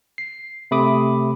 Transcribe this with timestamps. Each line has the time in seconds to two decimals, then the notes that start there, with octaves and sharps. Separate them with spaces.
0.18 C7
0.71 C3 A3 B5 D6 D#6